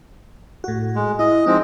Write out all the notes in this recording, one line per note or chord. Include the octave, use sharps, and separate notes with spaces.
A2 F#4
G#3
E4 D#5
F3 G#3 C4 D#4